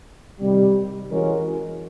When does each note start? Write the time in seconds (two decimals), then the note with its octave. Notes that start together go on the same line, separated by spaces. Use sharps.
0.40 C3 D#3 G3
1.09 E3 G#3 C#4 F#4 A#4